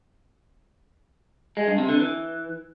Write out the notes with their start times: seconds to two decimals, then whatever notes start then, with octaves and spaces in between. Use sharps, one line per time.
1.57 G#3
1.67 G2
1.78 C3
1.89 D3
1.99 E3